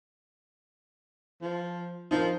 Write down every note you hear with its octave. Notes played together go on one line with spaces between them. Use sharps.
F3
F3 D#4 A#4